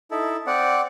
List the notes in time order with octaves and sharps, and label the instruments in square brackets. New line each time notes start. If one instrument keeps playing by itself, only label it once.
[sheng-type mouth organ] D#4 E4 A4
C4 D5 F#5